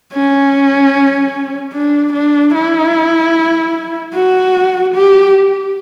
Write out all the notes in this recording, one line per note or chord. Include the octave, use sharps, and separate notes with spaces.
C#4
D4
D4
E4
F#4
G4